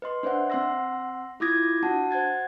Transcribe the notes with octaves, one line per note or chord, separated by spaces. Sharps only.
B4 D#5 C6
D4 C5 D5 E5 F#5
C4 F#5 C6 E6 A#6
E4 F4 D6 D#6 G#6 A#6
D4 F#4 F#5 A5
C5 F#5 G#6 A6